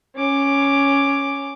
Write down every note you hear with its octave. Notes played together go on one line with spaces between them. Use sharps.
C#4 D6